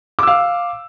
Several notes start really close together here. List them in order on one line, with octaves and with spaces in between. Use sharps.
D6 E6 F5